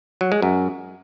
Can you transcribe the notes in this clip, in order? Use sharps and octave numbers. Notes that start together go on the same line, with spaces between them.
F#3
G#3
F#2